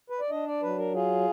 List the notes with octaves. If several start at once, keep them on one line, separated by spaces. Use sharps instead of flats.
B4
D5
D4 D#5
D5
F#3 B4
A#4
F4 G#4